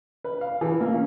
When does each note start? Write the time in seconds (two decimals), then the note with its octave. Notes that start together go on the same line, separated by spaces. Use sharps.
0.24 B4
0.41 F5
0.61 E3
0.81 A#3
0.92 C#4